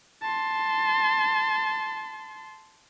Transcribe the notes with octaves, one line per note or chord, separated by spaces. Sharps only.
A5 C6